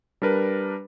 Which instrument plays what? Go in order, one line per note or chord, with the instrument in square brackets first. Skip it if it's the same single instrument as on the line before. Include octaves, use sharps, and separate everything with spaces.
[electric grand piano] G3 D4 A#4 B4